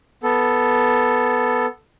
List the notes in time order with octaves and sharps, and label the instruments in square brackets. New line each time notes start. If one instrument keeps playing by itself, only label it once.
[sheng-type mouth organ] B3 A4